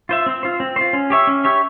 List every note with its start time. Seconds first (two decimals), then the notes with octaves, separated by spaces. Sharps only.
0.09 F4 C5 E5
0.26 C4
0.43 F4 C5
0.60 C4
0.76 F4 C5
0.93 C#4
1.10 G4 C#5 E5
1.27 C#4
1.44 G4 C#5 E5